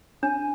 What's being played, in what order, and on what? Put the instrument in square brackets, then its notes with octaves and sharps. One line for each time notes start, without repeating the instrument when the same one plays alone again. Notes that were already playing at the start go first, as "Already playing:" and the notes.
[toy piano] D4 [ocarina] G#5